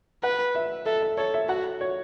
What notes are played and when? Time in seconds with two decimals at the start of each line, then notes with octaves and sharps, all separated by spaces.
0.23 B4 F#5
0.55 E5
0.86 A4 E5
1.02 E5
1.18 A4 C#5
1.34 E5
1.49 F#4 F#5
1.81 C#5